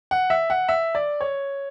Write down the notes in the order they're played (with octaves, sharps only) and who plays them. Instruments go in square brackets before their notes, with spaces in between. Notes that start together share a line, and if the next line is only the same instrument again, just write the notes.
[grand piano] F#5
E5
F#5
E5
D5
C#5